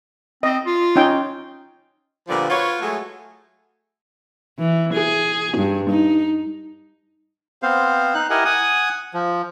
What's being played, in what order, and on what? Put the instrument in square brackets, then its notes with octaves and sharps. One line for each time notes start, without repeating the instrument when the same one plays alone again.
[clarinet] C4 [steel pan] D#5
[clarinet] F4
[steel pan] C#4 D#4 G5
[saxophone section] A#2 D3 F3 G3 B3
F4 F#4 B4 C#5
F#3 G#3 A3
[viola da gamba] E3
G#4
G2
D#4
[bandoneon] B3 C4 C5 F5
D#4 F#6
E4 G4 A#4 D#5 F#5 G#5
F#5 G#5 D#6
F3